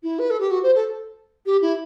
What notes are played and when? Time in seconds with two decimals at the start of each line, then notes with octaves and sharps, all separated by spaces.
0.03 E4
0.19 B4
0.30 A4
0.40 G4
0.51 F#4
0.63 C5
0.75 A4
1.46 G4
1.62 E4